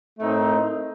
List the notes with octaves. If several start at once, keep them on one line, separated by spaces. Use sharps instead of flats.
A2 A3 C4 D#4 A#4